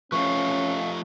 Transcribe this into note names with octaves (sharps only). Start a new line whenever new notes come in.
F3 A3 C#4 B4 E5 F5 C#6